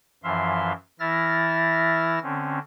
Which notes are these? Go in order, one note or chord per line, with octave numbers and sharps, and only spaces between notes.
F#2 E3 F3 E5 F5 C6
E3 E4 E5 F6 A6 A#6
D3 C4 C#4